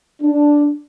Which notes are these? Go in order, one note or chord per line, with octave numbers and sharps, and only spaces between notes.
D4